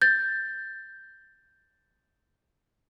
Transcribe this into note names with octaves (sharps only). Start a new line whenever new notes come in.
G6 A6